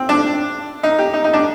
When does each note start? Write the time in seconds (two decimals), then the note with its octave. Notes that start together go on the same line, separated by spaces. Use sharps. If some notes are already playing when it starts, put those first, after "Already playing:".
Already playing: C4
0.09 D4
0.83 D#4
0.98 G4
1.14 D#4
1.24 D#4
1.33 D4